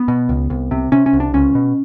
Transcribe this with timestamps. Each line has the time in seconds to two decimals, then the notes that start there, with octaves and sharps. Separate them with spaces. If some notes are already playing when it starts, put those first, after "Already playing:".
Already playing: B3
0.08 B2
0.29 C#2
0.50 C2
0.71 C3
0.92 C3 C#4
1.06 C#4
1.13 C2
1.20 D4
1.34 C#2 C#4
1.55 B2